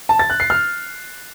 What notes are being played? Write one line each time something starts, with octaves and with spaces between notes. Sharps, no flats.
A5
A6
F#6
C7
F6